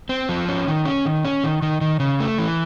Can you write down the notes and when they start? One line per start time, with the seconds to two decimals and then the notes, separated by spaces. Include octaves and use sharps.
0.09 C4
0.29 F3
0.48 C#4
0.68 D#3
0.85 C#4
1.05 D#3
1.25 C#4
1.44 D#3
1.62 D#3
1.81 D#3
2.00 C#3
2.20 A3
2.38 E3